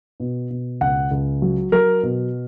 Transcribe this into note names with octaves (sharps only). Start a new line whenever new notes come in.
B2
B2
C#2 F#5
C#2
F#3
F#3 A#4
B2